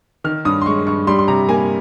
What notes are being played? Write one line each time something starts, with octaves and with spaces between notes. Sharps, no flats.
D#3 F6
G2 D#6
C6
G#3 C#6
G2 C#6
G3 C6
C6
C3 A#5
A#3 G#5